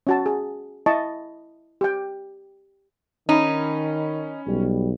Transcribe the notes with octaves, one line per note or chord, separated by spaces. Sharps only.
C#4 F#4 A5
G#4
E4 D#5 A5 C#6
G4 G5
D#3 C#4 D#4 B5
B1 G3